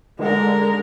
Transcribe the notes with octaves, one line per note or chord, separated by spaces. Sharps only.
D3 G#3 A#4